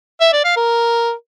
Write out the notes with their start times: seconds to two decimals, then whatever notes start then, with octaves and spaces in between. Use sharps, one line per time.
0.21 E5
0.33 D5
0.45 F5
0.56 A#4